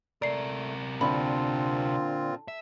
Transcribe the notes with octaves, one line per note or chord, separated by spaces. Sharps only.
C3 A3 A#4 D5 C7
A#2 D3 C4 F4 B5
E5